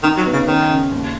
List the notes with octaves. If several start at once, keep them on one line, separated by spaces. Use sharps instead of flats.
D#3 D#4
F#3
B3
C#3
D#3 C#4
C#3
D#2